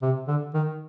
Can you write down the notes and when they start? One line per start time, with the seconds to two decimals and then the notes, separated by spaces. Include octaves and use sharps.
0.02 C3
0.28 D3
0.54 D#3